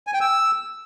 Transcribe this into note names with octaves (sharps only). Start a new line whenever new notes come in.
G#5
G5
E6